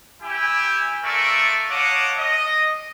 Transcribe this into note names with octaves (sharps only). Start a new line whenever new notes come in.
E4 G4 G#5
A3 F4 A#4 D5 E5 C#6
C#5 D#5 F5 F#5 A5 D6
D#5